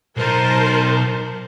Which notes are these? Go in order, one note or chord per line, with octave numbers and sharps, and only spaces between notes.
B1 D#4 A#4 C5 A5